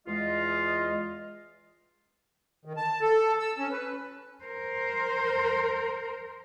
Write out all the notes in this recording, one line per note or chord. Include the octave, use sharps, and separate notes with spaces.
E2 G#3 F4 D#5
D#3
A5
A4
E6
C#4
B4
A#4 C5